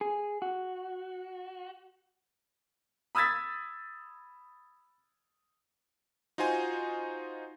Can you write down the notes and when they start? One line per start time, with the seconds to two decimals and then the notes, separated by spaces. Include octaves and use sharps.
0.01 G#4
0.42 F#4
3.15 B5 D#6 E6 G#6 A6 B6
6.38 D#4 F4 F#4 C5 G#5